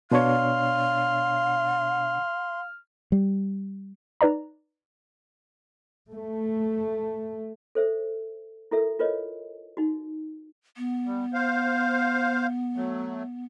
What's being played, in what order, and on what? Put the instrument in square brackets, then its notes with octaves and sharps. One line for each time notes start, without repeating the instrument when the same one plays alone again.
[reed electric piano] B2 D4 C#5 [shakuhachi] F5 [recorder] C6 [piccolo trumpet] F6
[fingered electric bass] G3
[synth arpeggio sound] D#4 B4 D5 A#5
[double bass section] A3
[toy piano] A4 C5 E5
E4 F#4 A4 A#4 E5
F4 A#4 B4 C#5 D#5
D#4 F#4
[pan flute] B3
[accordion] G3
C5 F5
F#3 A3